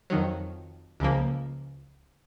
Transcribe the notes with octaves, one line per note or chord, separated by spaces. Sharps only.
F2 D#3 F#3
C#2 C#3 F3 A#3